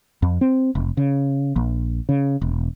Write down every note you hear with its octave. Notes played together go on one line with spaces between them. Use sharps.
F2
C4
F1
C#3
A#1
C#3
E1